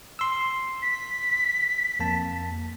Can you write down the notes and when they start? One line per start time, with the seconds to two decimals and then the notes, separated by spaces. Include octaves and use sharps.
0.19 C6 E6
0.82 B6
1.99 F2 A#3 A5